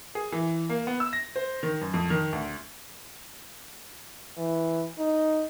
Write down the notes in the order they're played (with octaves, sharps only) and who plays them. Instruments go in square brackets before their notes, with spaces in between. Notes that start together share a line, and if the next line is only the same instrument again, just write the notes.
[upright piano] G#4
E3
A#3
B3
E6
A#6
C5
D#3
F#2
F2
D#3
D2
[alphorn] E3
D#4